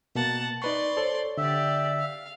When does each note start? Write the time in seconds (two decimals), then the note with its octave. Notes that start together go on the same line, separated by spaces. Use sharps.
0.15 B2 A#3 F#5 A5
0.62 D#4 B4 D5 C6 C#6
0.97 A4 C5 C#5
1.38 D3 G4 D5 E5
1.99 F5